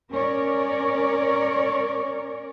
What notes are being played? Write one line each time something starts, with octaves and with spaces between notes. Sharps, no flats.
C#4 A#4 C#5 D5